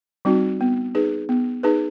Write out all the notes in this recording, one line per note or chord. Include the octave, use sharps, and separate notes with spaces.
G3 C4 D#4 F#4
B3
D#4 G#4 B4
B3
D#4 G#4 B4